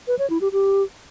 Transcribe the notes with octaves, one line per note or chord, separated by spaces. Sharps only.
B4
C#5
E4
G4
G4